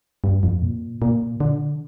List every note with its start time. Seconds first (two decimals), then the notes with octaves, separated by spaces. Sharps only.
0.24 G2
0.43 F2
0.62 A#2
1.02 A#2
1.40 D3